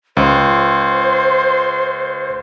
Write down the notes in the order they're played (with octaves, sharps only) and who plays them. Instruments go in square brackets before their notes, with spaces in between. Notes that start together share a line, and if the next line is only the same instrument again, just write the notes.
[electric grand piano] C#2 [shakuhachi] C5